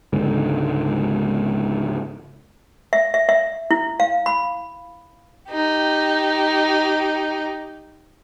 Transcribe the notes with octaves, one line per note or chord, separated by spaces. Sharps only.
C#2 G#2 D3
E5
E5
E5
E4
F5
B5
D#4 G4